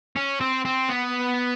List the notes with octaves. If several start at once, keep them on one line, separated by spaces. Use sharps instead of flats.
C#4
C4
C4
B3